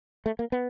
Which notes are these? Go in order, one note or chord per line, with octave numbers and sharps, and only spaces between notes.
A3
A#3
B3